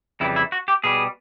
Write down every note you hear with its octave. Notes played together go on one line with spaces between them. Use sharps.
F2 C#3 E3 G3 E4
E4
F#4
G4
B2 G3 B3 G#4